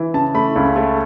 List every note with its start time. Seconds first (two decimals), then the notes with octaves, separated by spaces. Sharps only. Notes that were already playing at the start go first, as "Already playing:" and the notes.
Already playing: E3
0.14 C#3 A5
0.34 A3 B5
0.56 C#2
0.76 A3